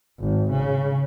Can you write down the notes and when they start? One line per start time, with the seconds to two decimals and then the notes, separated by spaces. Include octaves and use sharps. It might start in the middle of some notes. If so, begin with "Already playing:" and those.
0.19 G#1
0.50 C#3